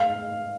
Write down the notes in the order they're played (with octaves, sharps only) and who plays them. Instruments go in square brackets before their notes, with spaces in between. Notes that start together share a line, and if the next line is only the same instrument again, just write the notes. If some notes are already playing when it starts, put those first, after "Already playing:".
Already playing: [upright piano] F5